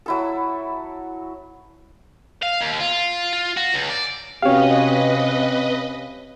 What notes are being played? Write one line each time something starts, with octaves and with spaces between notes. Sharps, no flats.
F#3 E4 A4
F5
D#2
F4
F4
F#4
C#2
D5
C3 C#4 F#4 G4 B4 C#5 D#5 F5